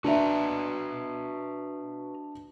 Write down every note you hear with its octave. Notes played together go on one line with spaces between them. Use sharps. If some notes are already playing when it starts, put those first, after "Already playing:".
D4 F#4 B4 E5 A#5